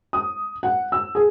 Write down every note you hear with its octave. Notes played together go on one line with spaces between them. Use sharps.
D#6
F#5
E6
G#4